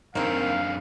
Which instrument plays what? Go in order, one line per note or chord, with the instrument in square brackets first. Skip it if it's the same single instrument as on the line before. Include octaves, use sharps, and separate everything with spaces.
[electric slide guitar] F#2 D4 G#4 [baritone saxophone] D#3 [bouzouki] A#3 C4 [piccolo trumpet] F5